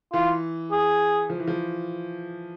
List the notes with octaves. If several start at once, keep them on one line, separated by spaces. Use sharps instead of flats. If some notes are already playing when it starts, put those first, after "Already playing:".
E3 F4
G#4
F3
E3
F3